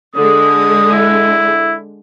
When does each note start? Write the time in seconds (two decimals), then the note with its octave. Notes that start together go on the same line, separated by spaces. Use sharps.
0.15 D3 G#3 D#6
0.92 E4